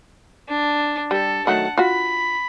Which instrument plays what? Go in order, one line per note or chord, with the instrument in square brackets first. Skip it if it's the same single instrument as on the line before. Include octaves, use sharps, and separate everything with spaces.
[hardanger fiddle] D4
[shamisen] G3 [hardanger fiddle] A4
[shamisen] D#3 F#3 A3 [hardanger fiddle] F#5 A5
[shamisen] F4 F#4 [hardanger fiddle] B5